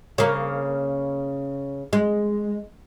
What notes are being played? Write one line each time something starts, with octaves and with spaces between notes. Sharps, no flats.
C#3 A#3
G#3